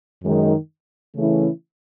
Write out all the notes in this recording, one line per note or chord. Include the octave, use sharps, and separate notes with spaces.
F#2 D#3 G#3 D#4
C#3 E3 A3 C#4 E4